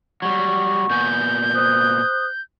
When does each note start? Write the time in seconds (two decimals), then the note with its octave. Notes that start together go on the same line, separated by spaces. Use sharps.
0.22 F#3 G3 F#5 C#6
0.90 A#2 B3 G#5 G6
1.54 C5 D#6 F#6